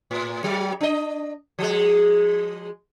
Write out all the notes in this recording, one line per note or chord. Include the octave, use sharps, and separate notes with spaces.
A2
F#3
D4 D#5
F3 G#3